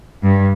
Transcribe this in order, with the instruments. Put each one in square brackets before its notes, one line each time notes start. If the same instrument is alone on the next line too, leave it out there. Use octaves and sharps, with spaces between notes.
[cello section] G2